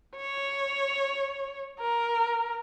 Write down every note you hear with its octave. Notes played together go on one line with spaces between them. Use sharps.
C#5
A#4